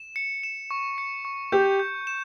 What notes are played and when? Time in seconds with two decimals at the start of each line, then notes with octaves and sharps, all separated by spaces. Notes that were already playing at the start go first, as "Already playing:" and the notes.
Already playing: E7
0.16 C#7
0.43 E7
0.71 C#6
0.98 C#7
1.25 C#6
1.52 G4 G6
1.79 G6
2.07 E7